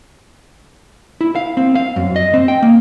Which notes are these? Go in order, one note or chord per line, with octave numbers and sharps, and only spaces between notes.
E4
F5
C4
F5
F#2
D#5
C4
G5
A#3